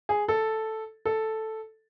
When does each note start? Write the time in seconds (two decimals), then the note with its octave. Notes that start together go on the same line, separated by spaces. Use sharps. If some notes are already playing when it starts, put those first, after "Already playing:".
0.09 G#4
0.28 A4
1.05 A4